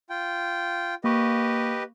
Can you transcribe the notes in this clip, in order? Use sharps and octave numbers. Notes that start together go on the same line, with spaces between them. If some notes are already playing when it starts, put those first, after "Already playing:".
F4 G5
A#3 G4 B4 D#5 C#6